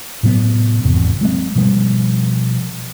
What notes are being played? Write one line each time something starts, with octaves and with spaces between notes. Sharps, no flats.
A2 C3 F#3 B3
G#1 E2 C3
F#3 G#3 C4
B2 F3 G3